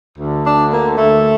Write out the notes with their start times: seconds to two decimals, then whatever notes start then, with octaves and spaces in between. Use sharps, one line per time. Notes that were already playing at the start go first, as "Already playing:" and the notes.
0.19 D2 D3
0.45 D4
0.70 A#3
0.97 D2 D3 A3